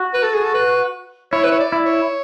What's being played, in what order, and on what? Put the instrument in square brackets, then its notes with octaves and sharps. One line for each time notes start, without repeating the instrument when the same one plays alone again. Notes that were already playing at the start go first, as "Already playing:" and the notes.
Already playing: [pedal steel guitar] F#4
[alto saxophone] B4
A4
G#4
A4
B4
[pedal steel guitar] E4 [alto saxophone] C#5
[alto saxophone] B4
C#5
D5
[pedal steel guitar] E4
[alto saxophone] C#5